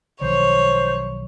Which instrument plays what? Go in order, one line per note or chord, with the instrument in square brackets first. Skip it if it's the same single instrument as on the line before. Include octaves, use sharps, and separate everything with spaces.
[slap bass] B1 D#3 F3 [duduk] C5 [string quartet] C#5